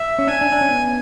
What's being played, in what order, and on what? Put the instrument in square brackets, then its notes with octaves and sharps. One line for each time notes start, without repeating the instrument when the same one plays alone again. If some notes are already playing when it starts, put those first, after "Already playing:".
Already playing: [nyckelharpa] E5
[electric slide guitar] C#4
[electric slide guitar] D4 [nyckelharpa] G#5
[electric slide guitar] D4
D4
C#4
B3